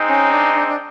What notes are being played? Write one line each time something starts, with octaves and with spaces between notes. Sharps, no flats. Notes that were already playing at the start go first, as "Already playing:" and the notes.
Already playing: G#3 C4 D#4
C#4
D4
D4
D4